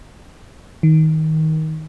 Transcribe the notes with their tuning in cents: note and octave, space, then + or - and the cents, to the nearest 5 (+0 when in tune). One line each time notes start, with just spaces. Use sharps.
D#3 +20